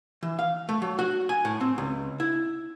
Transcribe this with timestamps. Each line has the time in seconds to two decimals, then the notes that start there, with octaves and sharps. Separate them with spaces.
0.22 E3
0.39 F5
0.69 A3
0.82 F#3
0.99 F#4
1.29 G#5
1.45 A2
1.61 C4
1.78 C#2
2.20 E4